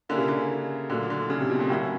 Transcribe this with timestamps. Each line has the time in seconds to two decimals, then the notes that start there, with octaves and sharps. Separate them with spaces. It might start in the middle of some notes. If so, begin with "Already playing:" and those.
0.09 D3 A#3 C#4 E4 G4 A#4
0.18 C#3
0.28 D3
0.90 A#2 D3 F#3 A3
1.10 D3
1.30 C#3
1.40 C3
1.50 B2
1.60 A#2
1.70 A2 F#3 A#3 C#4 E4